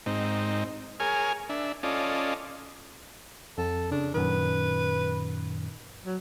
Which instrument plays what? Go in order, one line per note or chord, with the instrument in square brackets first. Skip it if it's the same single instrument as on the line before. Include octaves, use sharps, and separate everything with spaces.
[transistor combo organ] G#2 C4 D#4
G#4 A#4 C#5 G#5 F6
D4 E5
C#4 F4 A4 D5 D#5
[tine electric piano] F2 [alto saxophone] A4
[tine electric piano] C#3 [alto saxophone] D4
[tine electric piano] F#2 A#2 D#3 [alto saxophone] B4
[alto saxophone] F#3